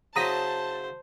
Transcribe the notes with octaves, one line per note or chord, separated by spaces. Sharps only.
C#3 F#3 E4 C5 A5 A#5 D#6 B6